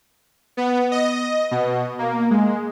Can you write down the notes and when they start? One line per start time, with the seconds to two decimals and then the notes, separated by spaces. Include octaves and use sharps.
0.57 B3
0.91 D#5
1.51 B2
1.99 A#3
2.31 G#3